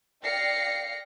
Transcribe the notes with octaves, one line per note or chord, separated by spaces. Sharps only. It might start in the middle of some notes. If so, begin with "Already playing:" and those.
D5 F5 G5 A#6 C7 C#7